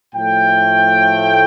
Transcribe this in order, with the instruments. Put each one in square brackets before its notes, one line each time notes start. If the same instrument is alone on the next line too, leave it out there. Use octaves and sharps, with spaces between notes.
[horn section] A2 F3 A3 G5